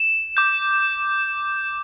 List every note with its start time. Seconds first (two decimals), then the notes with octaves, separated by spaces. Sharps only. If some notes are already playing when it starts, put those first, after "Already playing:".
Already playing: E7
0.37 D6 G6